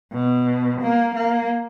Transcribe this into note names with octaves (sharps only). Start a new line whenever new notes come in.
B2
A#3
A#3